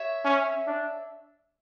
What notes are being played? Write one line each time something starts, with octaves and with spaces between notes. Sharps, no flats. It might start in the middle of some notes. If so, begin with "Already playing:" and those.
Already playing: C#5 E5
C#4
D4